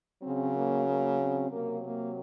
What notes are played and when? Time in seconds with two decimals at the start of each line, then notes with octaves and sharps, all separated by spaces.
0.23 C#3 F#3 C4
0.56 A#3
0.87 A#3
1.20 C4
1.51 C3 F#3 A#3
1.83 A#3